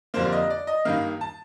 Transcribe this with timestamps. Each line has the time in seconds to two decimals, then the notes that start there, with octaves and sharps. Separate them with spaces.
0.14 F2 D3 G3 A#3 C5
0.25 D5
0.32 D#5
0.50 D5
0.67 D#5
0.85 G2 D#3 A#3 F5
1.21 A5